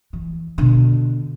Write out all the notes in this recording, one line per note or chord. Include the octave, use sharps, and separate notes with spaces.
E3
B2 D3